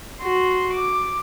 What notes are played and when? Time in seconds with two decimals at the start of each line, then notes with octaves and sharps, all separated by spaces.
0.21 F#4 C6
0.74 D6